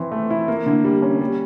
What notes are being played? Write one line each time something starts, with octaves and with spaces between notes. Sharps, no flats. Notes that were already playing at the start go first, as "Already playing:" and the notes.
Already playing: E3 C4
A3
E4
A#3
D3
G3
C#4
G3